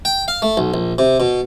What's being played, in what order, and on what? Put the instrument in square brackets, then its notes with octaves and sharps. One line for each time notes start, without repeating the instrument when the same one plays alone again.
[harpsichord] G5
F5
A3
B1
A#1
C3
B2